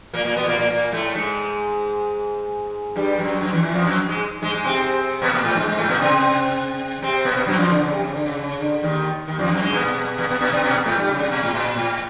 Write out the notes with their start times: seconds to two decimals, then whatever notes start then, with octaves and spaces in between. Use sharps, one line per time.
0.13 A#2 A#3
0.24 A#2 A#3
0.36 B2 B3
0.47 A#2 A#3
0.59 A#2 A#3
0.69 A#2 A#3
0.92 A2 A3
1.15 G#2 G#3
2.96 G2 G3
3.18 F#2 F#3
3.41 F#2 F#3
3.53 E2 E3
3.63 E2 E3
3.74 F2 F3
3.86 F#2 F#3
4.08 G#2 G#3
4.42 G#2 G#3
4.53 G#2 G#3
4.65 C3 C4
5.22 B2 B3
5.33 A#2 A#3
5.44 A2 A3
5.55 G#2 G#3
5.67 G#2 G#3
5.78 A2 A3
5.89 B2 B3
6.00 C3 C4
7.02 C3 C4
7.25 B2 B3
7.47 F#2 F#3
7.58 F2 F3
7.69 D3
7.81 C#3
7.93 C3
8.04 C#3
8.15 D3
8.26 C#3
8.38 C#3
8.60 D3
8.83 D#2 D#3
9.28 D#2 D#3
9.39 F2 F3
9.50 F#2 F#3
9.62 G#2 G#3
9.73 B2 B3
10.18 B2 B3
10.30 B2 B3
10.41 B2 B3
10.53 C3 C4
10.63 B2 B3
10.86 A2 A3
10.97 G2 G3
11.09 C#3
11.20 C3
11.31 B2
11.43 A2
11.53 A#2
11.77 A2